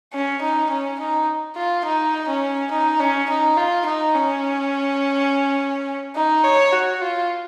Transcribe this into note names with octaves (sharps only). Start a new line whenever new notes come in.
C#4
D#4
C#4
D#4
F4
D#4
C#4
D#4
C#4
D#4
F4
D#4
C#4
D#4
C#5
F#4
F4